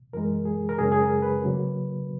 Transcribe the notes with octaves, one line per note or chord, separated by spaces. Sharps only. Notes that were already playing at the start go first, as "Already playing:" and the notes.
F#2 E3 G#3 A#4
G#4
A#4
F#2 C#3 G#3 C#4 G#4
G#4
A#4
B4
C#3 F#3 A#3